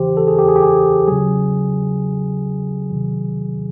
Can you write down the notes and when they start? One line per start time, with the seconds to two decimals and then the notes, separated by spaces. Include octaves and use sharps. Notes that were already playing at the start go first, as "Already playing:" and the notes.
Already playing: C#3 E3 G4 C5
0.17 A4
0.28 G#4
0.38 G4
0.48 G#4
0.56 G4
0.63 G#4
1.08 C#3 F#3 G#4
2.90 C3 D#3 F#3